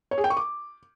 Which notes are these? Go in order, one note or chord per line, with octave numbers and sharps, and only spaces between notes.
C#5
G#4
G5
C#6
D6